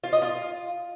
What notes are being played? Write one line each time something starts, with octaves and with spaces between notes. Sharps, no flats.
F4
D#5
F4